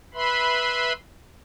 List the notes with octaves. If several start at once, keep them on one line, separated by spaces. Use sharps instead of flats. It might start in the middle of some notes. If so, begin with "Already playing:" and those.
B4 E5 B5 C6